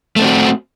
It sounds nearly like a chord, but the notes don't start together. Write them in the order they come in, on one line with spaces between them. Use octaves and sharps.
A3 B3 C4 F#4